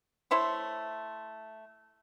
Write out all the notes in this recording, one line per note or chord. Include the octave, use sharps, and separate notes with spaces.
A3 E4 C5 C#5